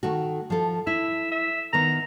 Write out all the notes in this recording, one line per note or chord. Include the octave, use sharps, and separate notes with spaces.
D#3 A3 F#4
F3 A4
E4 E5
E5
D#3 B3 A#4 A#5